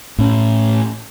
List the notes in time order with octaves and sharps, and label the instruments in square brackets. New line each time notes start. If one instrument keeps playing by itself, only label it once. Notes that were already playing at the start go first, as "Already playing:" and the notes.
[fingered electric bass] A2 C#4